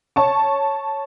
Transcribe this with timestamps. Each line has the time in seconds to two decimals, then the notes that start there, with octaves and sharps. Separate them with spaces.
0.16 C#5 A5 C#6